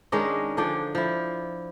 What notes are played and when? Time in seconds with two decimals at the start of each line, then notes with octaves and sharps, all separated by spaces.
0.12 D#3 G#3 C#4 D4
0.57 D3 F3 D4 G5
0.95 F3 E4